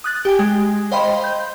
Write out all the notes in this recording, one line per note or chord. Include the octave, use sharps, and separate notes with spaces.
D#6 F#6 A6
G4 G5 G#5
G#3
C5 D#5 F5 G5 B5 C6
G6